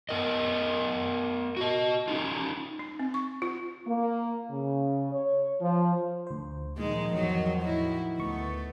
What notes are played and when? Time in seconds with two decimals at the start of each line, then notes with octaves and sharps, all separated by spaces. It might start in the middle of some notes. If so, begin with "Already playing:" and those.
0.09 B3 A#4 D#5
1.57 F#4 D#5
2.08 C#4 D#4 F4
2.79 D#4
3.00 C4
3.14 C#6
3.42 F4
3.87 A#3
4.50 C#3
5.12 C#5
5.61 F3
6.27 D2 C5
6.78 A#2 D#3 F3 G#3
7.14 E2 G#2 F#3
7.61 A2 E4 F#4
8.19 D2 A3 B3 C#6